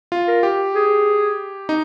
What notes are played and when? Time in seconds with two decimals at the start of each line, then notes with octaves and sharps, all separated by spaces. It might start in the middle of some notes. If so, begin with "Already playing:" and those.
0.12 F4
0.28 A#4
0.43 G4
0.75 G#4
1.69 D#4